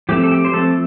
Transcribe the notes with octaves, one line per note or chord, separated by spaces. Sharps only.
F3 A3 C4 G4
A4
G4
C5
F3 A3 C4 A4